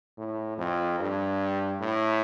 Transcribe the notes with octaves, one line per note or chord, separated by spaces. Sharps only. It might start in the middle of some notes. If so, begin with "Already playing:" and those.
A2
F2
G2
A2